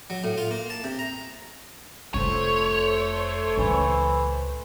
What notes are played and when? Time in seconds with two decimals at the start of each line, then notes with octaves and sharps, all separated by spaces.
0.10 F#3
0.24 A2
0.38 F4
0.51 A#3
0.70 A5
0.84 C3
0.99 A#5
2.14 F1 A3 F4 C5 C#5
3.57 C#2 A#2 E3